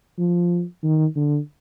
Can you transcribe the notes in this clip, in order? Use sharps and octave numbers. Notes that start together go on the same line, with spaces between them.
F3
D#3
D3